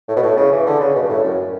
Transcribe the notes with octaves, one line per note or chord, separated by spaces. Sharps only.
A2
B2
A2
C#3
E3
D3
C#3
B2
G2
A2
F#2